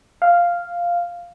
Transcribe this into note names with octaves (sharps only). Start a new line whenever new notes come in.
F5